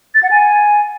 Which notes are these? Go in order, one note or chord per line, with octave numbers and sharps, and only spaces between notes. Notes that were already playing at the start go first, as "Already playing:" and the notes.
A6
F#5
G#5